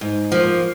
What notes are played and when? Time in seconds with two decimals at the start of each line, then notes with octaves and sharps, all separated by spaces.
0.01 G#2
0.32 F3 A#3